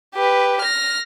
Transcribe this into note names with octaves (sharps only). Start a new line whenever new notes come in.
G4 B4
F6 A#6